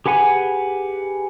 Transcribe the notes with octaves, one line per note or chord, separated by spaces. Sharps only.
G4 G#4 B4 F#5 G#5